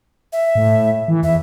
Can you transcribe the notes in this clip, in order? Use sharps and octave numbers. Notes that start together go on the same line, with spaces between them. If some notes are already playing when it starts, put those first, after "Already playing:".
E5
A2
E3
E2 E5